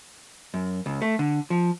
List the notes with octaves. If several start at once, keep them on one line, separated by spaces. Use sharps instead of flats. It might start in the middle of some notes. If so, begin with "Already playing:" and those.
F#2
C#2
A3
D3
F3